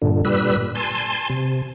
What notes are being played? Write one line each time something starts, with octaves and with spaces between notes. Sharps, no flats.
G2 A#2 D3
A#2 G3 B4 E6
G#5 A5 C6
C3